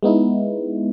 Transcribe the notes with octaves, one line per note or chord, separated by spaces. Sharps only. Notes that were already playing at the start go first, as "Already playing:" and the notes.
G#3 B3 D#4 E4